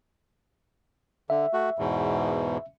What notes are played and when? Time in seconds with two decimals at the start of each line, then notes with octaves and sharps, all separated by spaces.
1.30 D3 E5
1.53 A3 F#4
1.79 E2 G#2 B2